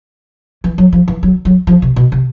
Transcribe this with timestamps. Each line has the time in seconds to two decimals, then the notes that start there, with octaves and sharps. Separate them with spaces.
0.64 E3
0.78 F#3
0.93 F3
1.08 E3
1.23 F#3
1.45 F#3
1.67 F3
1.82 C3
1.96 B2
2.12 C3